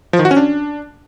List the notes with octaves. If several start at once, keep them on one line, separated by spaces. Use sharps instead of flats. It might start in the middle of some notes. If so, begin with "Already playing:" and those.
F3
D#3
F#4
C#4
D4